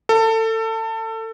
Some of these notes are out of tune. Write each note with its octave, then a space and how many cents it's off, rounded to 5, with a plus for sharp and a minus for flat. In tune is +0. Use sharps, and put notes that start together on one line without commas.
A4 +25